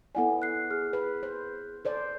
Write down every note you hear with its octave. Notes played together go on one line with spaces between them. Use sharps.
B3 E4 A4 D5 F#5 G#5
F#6 C7
G#4 F6
B4
C5
A4 C5 D5